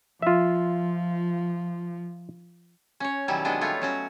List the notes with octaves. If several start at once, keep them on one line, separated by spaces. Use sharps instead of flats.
F3 F4 E5
C#4 C#5
B2 D#3 F#3 G3 C#4 E4
D#3 F#3 G#3 B3 D4 D#5
G3 A3 F4 C#5
F#3 C#4 F#4